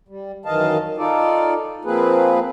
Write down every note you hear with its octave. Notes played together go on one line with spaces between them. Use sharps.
G3
F#2 D#3 E3 D#5 F5 A5
D#4 F4 A4 D5
F3 A#3 C4 G#4 B4